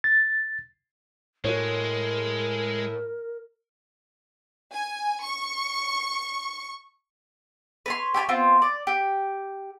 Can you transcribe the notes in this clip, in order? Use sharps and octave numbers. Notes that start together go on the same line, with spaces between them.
A6
A2 G#3 F#4 A#4 C#5
G#5
C#6
B4 C#5 C6
G4 C#5 G#5 B5
B3 C4 F4
D5
G4